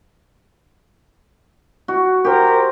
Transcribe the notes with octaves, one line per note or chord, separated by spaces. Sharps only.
F#4
G4 A#4 C5